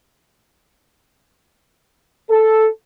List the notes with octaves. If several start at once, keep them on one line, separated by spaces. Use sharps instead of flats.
A4